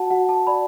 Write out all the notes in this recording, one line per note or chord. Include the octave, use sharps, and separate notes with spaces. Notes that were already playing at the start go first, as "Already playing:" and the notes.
Already playing: F#4 F#5 A5
F#4 F#5
A5
D5 B5